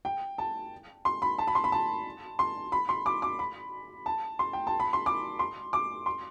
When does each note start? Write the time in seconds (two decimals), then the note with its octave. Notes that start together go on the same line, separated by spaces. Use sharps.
0.05 G5
0.38 A5
1.05 C6
1.22 B5
1.39 A5
1.47 B5
1.55 C6
1.64 B5
1.72 A5
2.39 C6
2.72 B5
2.89 C6
3.06 D6
3.22 D6
3.39 B5
4.06 A5
4.39 C6
4.53 G5
4.67 A5
4.80 B5
4.93 C6
5.06 D6
5.39 C6
5.73 D6
6.06 C6